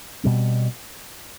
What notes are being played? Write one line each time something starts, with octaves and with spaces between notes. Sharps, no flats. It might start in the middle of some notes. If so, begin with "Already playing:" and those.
B2 G3 C4